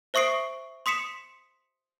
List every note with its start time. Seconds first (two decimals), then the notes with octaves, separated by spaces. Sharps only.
0.14 C5 E5 C#6 D#6 C7 D7
0.86 C6 D#6 B6 C#7 E7